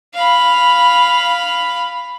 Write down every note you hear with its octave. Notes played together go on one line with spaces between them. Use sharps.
F5 B5